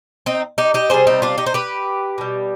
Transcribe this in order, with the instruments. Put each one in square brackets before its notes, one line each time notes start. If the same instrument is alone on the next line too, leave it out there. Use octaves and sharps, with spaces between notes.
[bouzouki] C4 D#4
D#4 G4
D#4 G4
C3 G3 G#4 C5
C4 D#4
D4 F4
D#4 G4
C5
G4 B4
B2 G3